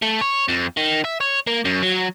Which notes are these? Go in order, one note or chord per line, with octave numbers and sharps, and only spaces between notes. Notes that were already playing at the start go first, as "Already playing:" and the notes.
A3
C#5
F2
D#3
E5
C#5
A#3
F#2
F#3